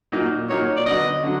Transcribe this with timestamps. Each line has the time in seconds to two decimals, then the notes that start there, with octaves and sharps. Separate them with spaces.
0.12 A#2 F#3 A#3 D#4
0.49 A#2 F#3 A#3 D#4 C#5
0.77 D5
0.86 D3 F#3 B3 D#5
1.24 D3 F#3